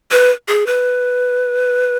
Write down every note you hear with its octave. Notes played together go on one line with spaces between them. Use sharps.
B4
G#4
B4